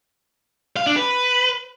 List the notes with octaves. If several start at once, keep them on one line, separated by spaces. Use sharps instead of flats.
F5
D4
B4